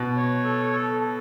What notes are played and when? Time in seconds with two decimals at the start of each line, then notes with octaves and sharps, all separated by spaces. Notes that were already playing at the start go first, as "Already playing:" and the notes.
Already playing: B2
0.16 C#5
0.44 A4
0.72 A4
1.01 A4